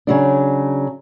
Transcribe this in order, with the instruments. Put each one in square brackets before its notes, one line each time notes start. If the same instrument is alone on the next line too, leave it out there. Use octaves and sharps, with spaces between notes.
[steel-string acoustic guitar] C#3 F#3 D4